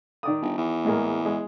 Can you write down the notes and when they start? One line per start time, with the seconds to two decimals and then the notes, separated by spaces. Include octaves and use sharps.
0.23 D#3 D5 D#6
0.42 G1
0.58 E2
0.85 A2 G#3 A#3
1.25 G#3